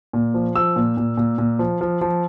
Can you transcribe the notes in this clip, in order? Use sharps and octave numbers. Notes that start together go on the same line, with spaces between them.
A#2
F3
F3 E6
A#2
A#2
A#2
A#2
F3
F3
F3